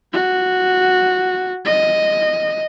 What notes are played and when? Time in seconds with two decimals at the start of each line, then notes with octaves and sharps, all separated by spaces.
0.13 F#4
1.65 D#5